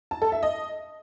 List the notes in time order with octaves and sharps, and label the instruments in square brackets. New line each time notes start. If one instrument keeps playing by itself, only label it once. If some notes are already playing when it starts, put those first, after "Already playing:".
[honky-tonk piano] A5
A4
E5
D#5